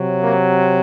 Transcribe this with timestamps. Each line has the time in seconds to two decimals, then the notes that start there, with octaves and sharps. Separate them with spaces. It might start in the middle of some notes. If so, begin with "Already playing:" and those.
Already playing: C3 F#3
0.21 A#3